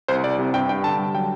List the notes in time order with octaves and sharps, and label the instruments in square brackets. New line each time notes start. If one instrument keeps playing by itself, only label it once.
[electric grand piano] C2 C5
C2 D5
C3
G2 G5
G2 G5
D3 A5
G3
F#3 G5